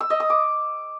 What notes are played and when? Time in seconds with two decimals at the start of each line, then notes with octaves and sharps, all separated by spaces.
0.01 E6
0.10 D#5
0.20 D#6
0.30 D6